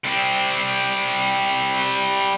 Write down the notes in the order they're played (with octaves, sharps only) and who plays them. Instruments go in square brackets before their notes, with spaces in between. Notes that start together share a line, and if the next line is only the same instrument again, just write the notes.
[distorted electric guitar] G3 C4